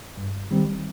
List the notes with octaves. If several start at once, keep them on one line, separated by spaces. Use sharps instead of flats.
G2
D#3 G3 C4